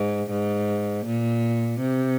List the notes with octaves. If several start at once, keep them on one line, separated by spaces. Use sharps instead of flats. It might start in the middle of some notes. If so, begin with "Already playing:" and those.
Already playing: G#2
G#2
A#2
C3